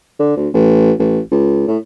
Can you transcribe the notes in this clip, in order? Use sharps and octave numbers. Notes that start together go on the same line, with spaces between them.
D3
D2
A1
A1
C#2
A2